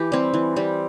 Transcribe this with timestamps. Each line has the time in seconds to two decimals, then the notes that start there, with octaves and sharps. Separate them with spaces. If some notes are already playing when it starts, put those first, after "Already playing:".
Already playing: E3 G4
0.12 G3 C4
0.34 E3
0.56 G3 C4